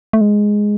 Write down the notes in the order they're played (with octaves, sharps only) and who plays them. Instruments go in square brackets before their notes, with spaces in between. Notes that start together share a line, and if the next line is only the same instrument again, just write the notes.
[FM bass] A3
G#3